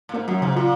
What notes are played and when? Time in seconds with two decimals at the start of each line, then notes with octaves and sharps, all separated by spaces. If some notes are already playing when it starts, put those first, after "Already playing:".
0.09 A#2
0.14 G#2 A#3
0.28 F#2 F#3
0.42 G#2 C#3
0.56 A#2 F4